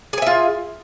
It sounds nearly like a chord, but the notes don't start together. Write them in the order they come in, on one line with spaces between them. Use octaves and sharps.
G#4 G#5 E5 F4